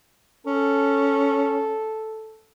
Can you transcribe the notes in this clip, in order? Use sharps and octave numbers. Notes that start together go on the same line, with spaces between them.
C#4 A4